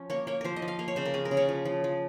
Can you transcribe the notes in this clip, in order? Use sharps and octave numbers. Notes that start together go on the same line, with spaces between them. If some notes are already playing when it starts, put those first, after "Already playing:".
Already playing: F3 C#4
A#3 C#5
A#3 C#5
F3 A#4 C5
D#5
F3
F5
A#3 F5
C#5
C#3 C5
A#4
C#4 G#4
A#4
C#3
C#5
F3
F3
F3